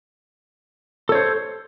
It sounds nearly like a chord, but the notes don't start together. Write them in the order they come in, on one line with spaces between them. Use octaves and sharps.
A4 C#5 C5